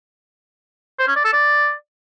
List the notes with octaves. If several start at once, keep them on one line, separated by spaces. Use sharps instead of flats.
C5
C#4
D5
A4
D5